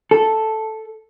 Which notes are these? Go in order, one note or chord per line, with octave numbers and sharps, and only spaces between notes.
A4